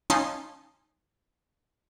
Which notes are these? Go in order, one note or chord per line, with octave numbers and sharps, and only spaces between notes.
C#4 D#4 F5 A5 C6